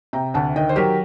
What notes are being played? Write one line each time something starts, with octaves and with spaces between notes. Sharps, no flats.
C3 G5 A#5
D2 F#5 A5
D#3 D#5 G5
C5
F#3 G4 A#4